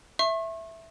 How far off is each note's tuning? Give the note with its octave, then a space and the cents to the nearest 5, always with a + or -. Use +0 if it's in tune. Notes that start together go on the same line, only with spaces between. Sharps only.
E5 +0 C#6 -40